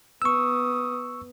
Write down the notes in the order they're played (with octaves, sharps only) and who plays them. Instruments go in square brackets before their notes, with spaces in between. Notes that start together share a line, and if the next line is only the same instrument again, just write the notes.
[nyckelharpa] B3 D#6 [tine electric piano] C#6 E6